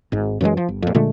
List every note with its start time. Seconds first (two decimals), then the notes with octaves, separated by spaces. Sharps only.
0.12 G#1 G#2
0.41 F#2 E3 G3 G#3
0.57 F3
0.68 G1
0.82 F2 A#2
0.95 A#2 D3 G#3 A3